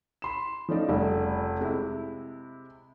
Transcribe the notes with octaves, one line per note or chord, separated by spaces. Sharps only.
B5 C6 E7
F3 A3 C#4 D#4 D5 D#5
F1 C#3 G3 A3
C3 G#3 E4